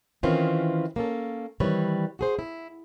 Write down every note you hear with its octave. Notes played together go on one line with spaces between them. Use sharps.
D#3 E3 C4 C#4 E4 F4
A#3 C#4 A4
D#3 E3 G3 C4 B4 C#5
F#4 G#4 C5
E4